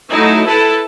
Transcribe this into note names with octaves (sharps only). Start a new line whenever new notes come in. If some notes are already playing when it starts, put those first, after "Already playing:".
F#3 A3 D#4 E4
E4 A4 B4 A5